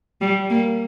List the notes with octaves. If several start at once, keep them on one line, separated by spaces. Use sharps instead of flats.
G3
A#3